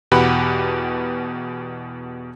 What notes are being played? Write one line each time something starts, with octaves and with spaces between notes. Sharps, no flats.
E2 B2 G4 B4 F#5 B5